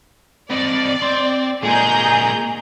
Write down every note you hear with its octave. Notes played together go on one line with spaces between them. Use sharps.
C4 D5 D#5
C4 C6
A#2 G#3 G#4 A#5 G6